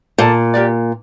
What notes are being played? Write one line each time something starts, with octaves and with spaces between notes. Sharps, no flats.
A#2 A4 D5 A5
G4 A#4 D5